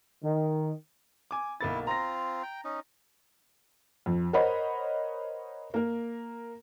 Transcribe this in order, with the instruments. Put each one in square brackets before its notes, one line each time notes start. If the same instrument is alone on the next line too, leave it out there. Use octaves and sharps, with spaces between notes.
[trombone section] D#3
[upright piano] G#5 D6
[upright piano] B1 A#3 A6 [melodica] E4
[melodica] C4 F4 [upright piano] A#5 A#6
[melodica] G5
C#4 D#4
[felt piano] F2
A#4 C5 C#5 D#5 F#5 B5
A#3 A#4